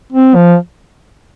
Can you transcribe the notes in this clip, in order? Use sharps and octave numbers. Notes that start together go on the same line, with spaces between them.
C4
F3